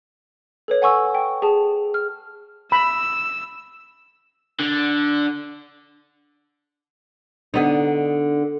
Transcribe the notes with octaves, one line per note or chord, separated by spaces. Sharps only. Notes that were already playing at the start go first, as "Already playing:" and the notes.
A4 B4 C#5
F#5 G#5 C#6 E6
G5
G#4 A5
F6
B5 E6
D3
D3 B3 D#4